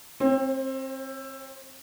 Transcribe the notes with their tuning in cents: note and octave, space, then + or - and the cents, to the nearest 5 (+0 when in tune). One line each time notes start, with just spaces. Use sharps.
C4 +25 C#5 -40